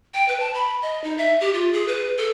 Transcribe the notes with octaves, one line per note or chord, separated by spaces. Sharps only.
G5
B4
A5
B5
D#5
D#4
E5
G4
F4
G#4
B4
A4